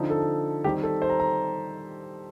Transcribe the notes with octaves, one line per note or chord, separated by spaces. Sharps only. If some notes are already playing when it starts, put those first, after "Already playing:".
Already playing: D3 F3 C4 D#4
A4
D#3 G3 C4 D#4 G4
A4
C5
A#5
A#5